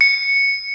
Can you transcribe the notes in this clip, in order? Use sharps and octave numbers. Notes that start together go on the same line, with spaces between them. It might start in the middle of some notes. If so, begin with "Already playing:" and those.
C#7